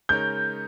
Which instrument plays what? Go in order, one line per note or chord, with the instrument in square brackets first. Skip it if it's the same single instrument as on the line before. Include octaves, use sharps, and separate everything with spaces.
[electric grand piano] C#3 G#3 D#4 A#4 C#5 [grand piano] G6